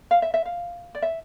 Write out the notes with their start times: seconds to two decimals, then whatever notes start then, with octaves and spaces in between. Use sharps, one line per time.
0.11 F5
0.22 E5
0.34 E5
0.45 F5
0.95 D5
1.02 E5